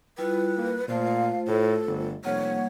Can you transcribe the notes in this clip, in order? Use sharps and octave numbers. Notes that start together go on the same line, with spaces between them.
G3 E4 F4 B4
A#3
A#2 A3 F4 C5 F5
A2 A4
G1
F1 G3 A#3 C#5 F#5